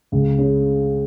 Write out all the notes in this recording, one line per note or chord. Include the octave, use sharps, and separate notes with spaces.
C#2
C#3